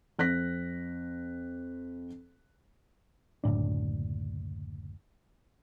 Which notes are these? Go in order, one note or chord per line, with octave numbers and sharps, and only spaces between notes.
F2 F#6 A#6 B6
F#1 D2 A2 D4